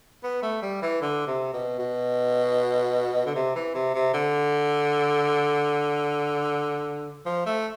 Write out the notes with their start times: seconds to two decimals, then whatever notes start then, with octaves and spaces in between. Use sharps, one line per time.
0.23 B3
0.43 A3
0.62 G3
0.82 E3
1.01 D3
1.27 C3
1.53 B2
1.79 B2
3.26 D3
3.35 C3
3.55 E3
3.75 C3
3.94 C3
4.13 D3
7.26 F3
7.46 A3